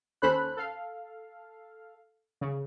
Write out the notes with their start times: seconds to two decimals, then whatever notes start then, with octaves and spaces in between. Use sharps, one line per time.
0.22 D#2 C#4 A4 C5 B5 F#6
0.57 A4 F5
2.41 C#3